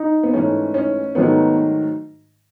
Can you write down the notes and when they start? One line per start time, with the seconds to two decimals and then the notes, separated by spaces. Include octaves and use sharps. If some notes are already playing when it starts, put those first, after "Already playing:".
Already playing: D#4
0.23 B3
0.33 G#2 E3 A3 C#4
0.74 C#4
1.15 G#2 D#3 F#3 A3 B3